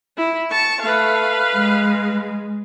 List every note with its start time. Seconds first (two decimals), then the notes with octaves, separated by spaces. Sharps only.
0.17 E4
0.51 A5 C#6
0.82 A3 B4 F5
1.53 G#3